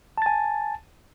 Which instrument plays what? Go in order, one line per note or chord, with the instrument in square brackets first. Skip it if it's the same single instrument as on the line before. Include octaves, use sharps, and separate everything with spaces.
[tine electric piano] A5
A6
G#5